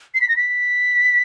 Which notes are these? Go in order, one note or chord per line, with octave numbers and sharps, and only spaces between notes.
C7
B6
A#6
B6